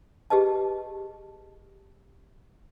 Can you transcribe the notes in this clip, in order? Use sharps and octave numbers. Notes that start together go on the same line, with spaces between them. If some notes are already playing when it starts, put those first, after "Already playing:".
G4 G#4 B4 D#5 A5